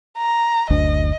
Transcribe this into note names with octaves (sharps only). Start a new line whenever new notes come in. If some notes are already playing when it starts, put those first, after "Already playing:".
A#5
F#1 D2 D4 D#5